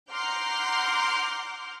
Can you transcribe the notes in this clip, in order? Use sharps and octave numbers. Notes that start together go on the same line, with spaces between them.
F#5 A#5 C6 D6 F6 G6